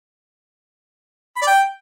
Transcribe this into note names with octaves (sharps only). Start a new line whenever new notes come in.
B5
D5
G5